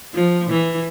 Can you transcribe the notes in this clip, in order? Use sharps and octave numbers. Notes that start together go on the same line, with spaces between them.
F3
E3